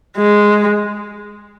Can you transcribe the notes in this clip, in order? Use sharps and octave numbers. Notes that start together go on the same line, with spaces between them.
G#3